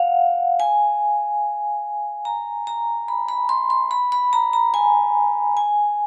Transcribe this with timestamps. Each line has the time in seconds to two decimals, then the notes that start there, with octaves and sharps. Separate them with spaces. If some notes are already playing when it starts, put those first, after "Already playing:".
Already playing: F5 F#5
0.60 G#5
2.25 A#5
2.67 A#5
3.08 B5
3.29 B5
3.49 C6
3.70 C6
3.91 B5
4.12 B5
4.33 A#5
4.53 A#5
4.74 G#5
5.57 G#5